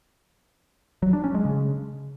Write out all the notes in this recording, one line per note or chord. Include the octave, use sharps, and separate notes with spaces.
F#3
D4
C#4
G#3
C#3